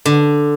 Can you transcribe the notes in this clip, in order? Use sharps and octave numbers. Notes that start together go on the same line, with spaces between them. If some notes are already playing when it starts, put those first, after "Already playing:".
D3